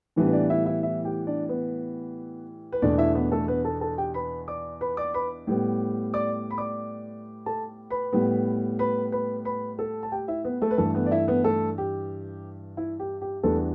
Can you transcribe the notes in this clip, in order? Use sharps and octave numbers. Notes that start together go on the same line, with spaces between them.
A2 E3 G3 B3 D4
B4
D4 D5
E4 E5
E4 E5
E4 E5
G4 G5
D4 D5
B3 B4
B4
E2 B2 A3 D4 D5
E4 E5
B3 B4
A3 A4
B3 B4
A4 A5
A4 A5
G4 G5
B4 B5
D5 D6
B4 B5
D5 D6
B4 B5
A2 G3 B3
D5 D6
B5
D5 D6
A4 A5
B4 B5
A2 G3 B3
B4 B5
B4 B5
B4 B5
A4 A5
A5
G4 G5
E4 E5
B3 B4
A3 A4
B4
G2 E3 A3 A4
B3 B4
D5
E4 E5
B3 B4
A3 A4
G4
E4
G4
G4
E2 E3 G3 A3 B3 D4 A4